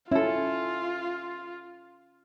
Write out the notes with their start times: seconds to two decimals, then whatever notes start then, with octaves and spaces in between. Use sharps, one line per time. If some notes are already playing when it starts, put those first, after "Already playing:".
0.11 C#4 E4 F4 A4